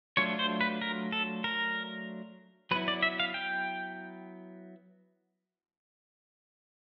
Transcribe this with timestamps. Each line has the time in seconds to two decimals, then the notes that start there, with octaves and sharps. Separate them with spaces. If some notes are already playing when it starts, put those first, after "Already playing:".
0.17 F#3 A3 D4 F4 C#5
0.39 C5
0.61 B4
0.81 A#4
1.12 A4
1.44 A#4
2.71 F#3 B3 E4 B4
2.88 D5
3.03 E5
3.20 F5
3.34 G5